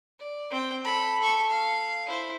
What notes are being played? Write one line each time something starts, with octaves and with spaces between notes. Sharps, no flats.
D5
C4 G5
A4 B5
A4 C#6
F5
E4 C5